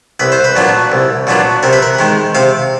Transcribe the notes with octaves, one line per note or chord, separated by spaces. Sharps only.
C2 B4
C5
B4
A#2 F#3 B3 D4
C2
A#2 F#3 B3 D4
C3 A#4
B4
A#4
D#3 G#3
C3 F5